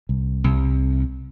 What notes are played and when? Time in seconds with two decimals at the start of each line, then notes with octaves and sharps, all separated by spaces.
0.09 C2
0.44 C2